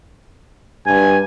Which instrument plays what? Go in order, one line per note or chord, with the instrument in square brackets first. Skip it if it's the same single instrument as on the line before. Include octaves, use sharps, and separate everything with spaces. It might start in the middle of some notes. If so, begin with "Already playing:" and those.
[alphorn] G2 [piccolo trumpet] G#5